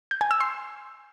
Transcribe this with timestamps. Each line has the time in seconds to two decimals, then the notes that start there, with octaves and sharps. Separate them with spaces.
0.11 G6
0.21 G#5
0.31 E6
0.40 C6